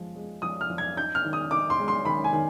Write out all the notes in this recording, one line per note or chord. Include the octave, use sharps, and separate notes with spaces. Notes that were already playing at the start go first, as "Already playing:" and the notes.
Already playing: F3 G#3
G#3
F3 D#6
F6
F3
G#6
D#4 G6
F6
D#3
D#6
D#4 D6
C6
G#3
C6
D#3 B5
G#5
D#3